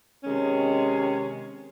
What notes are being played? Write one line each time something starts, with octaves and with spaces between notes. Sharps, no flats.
C3 D#3 G#3 C#4